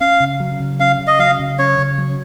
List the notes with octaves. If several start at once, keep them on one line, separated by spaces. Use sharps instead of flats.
C#4 F5
C#3
F#3
C#3
C#4 F5
C#3
D#5
F#3 F5
C#3
C#4 C#5
C#3
F#3